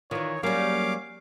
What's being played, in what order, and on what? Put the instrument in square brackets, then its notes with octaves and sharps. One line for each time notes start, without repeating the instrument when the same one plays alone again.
[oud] D#3 E3 [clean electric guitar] F4 D5 [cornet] C#5
[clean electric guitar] F#3 G#4 [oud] G3 A#3 [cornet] C#4 [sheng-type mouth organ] F5 D6